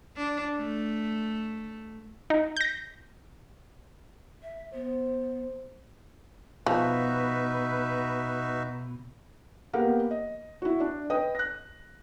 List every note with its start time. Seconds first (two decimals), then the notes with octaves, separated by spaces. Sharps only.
0.17 D4
0.57 A3
2.30 D#4
2.56 G6 A#6
4.43 E5
4.74 B3 C5
6.66 B2 F3 D#4 F#4 B4 E5
9.73 A#3 B3 G4 A#4 F5 F#5
10.11 D#5
10.62 E4 F#4
10.80 D4
11.10 B4 D#5 G5 D#6
11.35 F#6 A#6